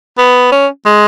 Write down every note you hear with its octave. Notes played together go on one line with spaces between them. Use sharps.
B3
C#4
G#3